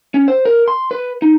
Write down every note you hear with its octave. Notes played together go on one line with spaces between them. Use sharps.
C#4
C5
A#4
C6
B4
D#4